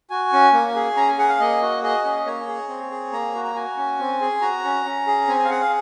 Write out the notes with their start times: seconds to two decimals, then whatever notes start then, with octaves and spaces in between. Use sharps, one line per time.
0.10 F#4 G#5
0.33 C#4
0.53 A#3
0.76 G#4
0.96 C#4 A#5
1.08 G#5
1.18 G#4 F#5
1.29 F5
1.40 A#3 D#5
1.62 F#4
1.83 G#4 D#5
2.04 C#4
2.26 A#3 C#5
2.47 G#4
2.69 C4
2.91 G#4
3.12 A#3 A#5
3.35 F#4
3.44 A#5
3.55 F#4 G#5
3.77 C#4
4.00 C4
4.21 G#4
4.41 F#4 A#5
4.64 C#4
4.86 C#4
5.07 G#4
5.28 C4 G#5
5.39 G#5
5.45 F5
5.50 G#4 F#5
5.60 F5